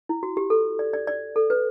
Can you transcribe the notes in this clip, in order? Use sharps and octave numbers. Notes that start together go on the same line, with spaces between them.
E4
F#4
G4
A4
D5
D5
D5
A4
B4